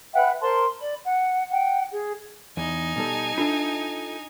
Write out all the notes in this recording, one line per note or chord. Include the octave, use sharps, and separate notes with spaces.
B4 E5 F#5 G5
A#4 C5 A5 C6
D5 B5
F#5
F#5 G5
G#4
E2 D#4 G#5
B2 G3 A4
D4 F4 A4 E5